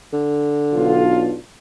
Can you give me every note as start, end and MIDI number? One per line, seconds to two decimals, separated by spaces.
0.13 1.08 50
0.73 1.33 35
0.73 1.37 62
0.73 1.37 65